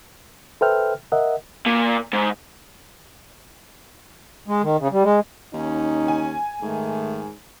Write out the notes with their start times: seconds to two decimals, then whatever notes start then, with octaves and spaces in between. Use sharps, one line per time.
0.61 A4 B4 C5 E5 G5 F6
1.12 A#4 D#5 E5 F#5
1.66 A#2
2.13 G#2
4.48 G#3
4.63 D#3
4.80 C#3
4.92 G3
5.04 G#3
5.53 D#2 C#4 D#4
6.08 G#5
6.62 G#2 D#3 A3